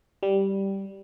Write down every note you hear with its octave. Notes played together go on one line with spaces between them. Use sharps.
G3